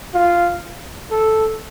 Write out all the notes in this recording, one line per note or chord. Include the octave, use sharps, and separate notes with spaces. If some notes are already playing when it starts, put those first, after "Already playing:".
F4
A4